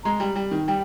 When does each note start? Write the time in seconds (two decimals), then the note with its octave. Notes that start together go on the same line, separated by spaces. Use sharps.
0.04 G#3 A#5
0.20 G3
0.36 G3
0.51 D#3
0.68 G3 G5